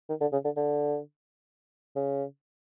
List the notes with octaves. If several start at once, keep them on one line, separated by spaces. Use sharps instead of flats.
D#3
D3
C#3
D3
D3
C#3